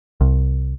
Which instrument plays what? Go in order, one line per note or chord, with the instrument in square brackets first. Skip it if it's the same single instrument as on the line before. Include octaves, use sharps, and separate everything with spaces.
[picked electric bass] C2